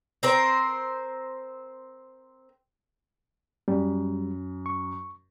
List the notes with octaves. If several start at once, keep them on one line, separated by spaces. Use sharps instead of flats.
C4 A#4 C5
F#2 G3
C#6